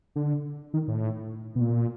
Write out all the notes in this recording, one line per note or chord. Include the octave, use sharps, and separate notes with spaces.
D3
D#3
A2
B2
A#2